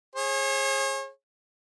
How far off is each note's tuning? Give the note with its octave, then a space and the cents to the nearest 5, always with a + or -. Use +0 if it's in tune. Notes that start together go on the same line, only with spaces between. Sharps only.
G#4 +0 C#5 -40